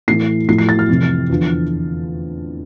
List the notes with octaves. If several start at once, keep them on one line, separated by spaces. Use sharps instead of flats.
A2 E3 C7
A2 F3 C7
C7
A6
F6
F2 C3 E3
E2 D3 F3